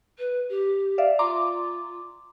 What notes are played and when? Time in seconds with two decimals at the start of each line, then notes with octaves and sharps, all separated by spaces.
0.18 B4
0.49 G4
0.98 D5 E5 F5
1.19 F4 A#5 C6 D6